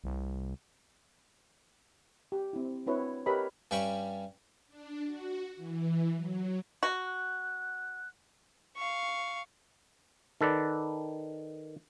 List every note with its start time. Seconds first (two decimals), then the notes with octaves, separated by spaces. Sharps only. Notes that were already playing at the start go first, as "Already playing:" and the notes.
0.04 C2
2.32 G4
2.53 C4 E4
2.87 C4 D4 E4 F#4 B4 C#5
3.26 G4 A#4 B4 C#5 D#5 B5
3.71 G2 G3 C#4 G5 B5 C#6
4.68 D4
5.05 F#4
5.56 E3
6.15 F#3
6.83 F#4
7.07 F#6
8.76 F5 C#6
10.41 D#3 A4 B4 D5